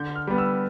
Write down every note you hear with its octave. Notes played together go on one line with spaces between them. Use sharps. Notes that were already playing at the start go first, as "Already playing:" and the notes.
Already playing: D3 G6
F6
G3 B3
E6